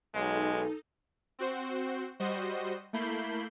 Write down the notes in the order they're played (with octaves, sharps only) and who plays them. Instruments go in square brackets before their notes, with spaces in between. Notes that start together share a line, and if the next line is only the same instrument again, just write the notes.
[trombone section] B1 F#3 G#3 [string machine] D#4 A4
[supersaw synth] C4 F#4 C5
G3 F#4 C5 D#5
A3 A#3 E4 B5 G6 C7